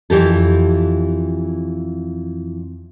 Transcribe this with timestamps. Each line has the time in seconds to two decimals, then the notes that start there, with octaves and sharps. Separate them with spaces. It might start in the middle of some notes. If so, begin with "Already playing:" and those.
0.10 F2 E3 G4 A4